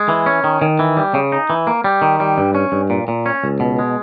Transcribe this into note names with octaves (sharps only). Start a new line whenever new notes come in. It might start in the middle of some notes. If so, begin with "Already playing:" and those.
Already playing: G#3
E3
C#4
D#3
D#3
E3
G3
C#3
D#4
E3
A#3
G3
D#3
G3
G2
C#4
G2
A#2
A#2
C#4
C#2
B2
G#3